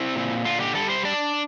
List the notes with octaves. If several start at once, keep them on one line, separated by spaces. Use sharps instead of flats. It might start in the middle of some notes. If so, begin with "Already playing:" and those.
Already playing: C4 E4
A#2
D3 F4
G4
G3 A4
C5
D4 D5